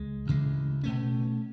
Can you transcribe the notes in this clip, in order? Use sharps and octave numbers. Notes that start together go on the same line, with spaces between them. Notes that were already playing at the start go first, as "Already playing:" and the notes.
Already playing: C#2 G#3
D2 C#3 E3 G#3
B2 A3 C#4